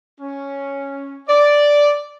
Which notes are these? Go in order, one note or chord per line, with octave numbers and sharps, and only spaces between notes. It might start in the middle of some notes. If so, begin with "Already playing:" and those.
C#4
D5